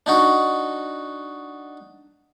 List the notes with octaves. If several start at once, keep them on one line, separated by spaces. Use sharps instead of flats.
D4 D#4 F#4